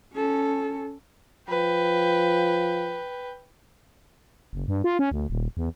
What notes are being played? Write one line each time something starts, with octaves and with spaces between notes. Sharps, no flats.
C#4 A4
F3 B4 G5
F#1
G2
F4
C#4
D2
D#1
E2